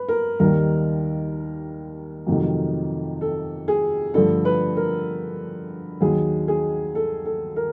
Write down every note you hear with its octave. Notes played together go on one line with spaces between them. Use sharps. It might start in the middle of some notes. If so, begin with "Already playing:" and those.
Already playing: B4
A#4
D#2 D#3 G3 A#4
F2 C3 D#3 F#3 A3
A4
G#4
G2 D3 F3 A3 A4
B4
A#4
D#2 D#3 F#3 G#4
G#4
A4
A4
A#4